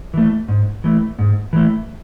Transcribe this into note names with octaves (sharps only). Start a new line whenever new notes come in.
E3 A3
G#2
E3 A3
G#2
E3 A3